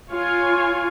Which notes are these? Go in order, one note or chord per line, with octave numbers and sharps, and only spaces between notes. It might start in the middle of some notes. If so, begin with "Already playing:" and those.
F4 C#5 F5 G#5